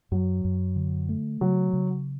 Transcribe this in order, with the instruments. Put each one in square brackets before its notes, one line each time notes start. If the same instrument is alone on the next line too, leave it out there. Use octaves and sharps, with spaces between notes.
[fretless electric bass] F#2 [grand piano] F#3
[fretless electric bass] F#2
D3
A3
[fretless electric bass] C#3 [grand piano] F#3
[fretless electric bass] C#3